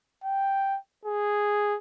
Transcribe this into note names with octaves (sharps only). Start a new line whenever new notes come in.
G5
G#4